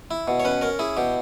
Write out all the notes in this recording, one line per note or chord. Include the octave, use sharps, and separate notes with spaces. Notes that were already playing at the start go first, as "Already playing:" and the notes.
E4
B2
C#5
C#4 B4
C#4 A#4
E4 G#4
B2 G4